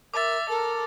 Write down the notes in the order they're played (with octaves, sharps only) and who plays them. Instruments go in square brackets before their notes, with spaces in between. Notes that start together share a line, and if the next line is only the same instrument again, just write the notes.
[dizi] A#4 [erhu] E5 [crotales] D6 A6
[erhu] A4 [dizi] A#4